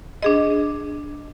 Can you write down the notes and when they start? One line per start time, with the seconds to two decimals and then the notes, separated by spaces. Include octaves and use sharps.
0.23 D4 G#4 D#5